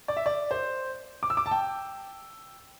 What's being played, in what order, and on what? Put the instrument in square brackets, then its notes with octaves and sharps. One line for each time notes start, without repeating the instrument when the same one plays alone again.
[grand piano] D5
E5
D5
C5
D6
E6
D6
A5
G5